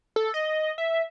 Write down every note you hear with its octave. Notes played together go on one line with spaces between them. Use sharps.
A4
D#5
E5